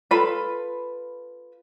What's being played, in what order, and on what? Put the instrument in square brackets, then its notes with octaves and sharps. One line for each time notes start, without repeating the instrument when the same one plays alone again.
[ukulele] F4 A4 B4 B5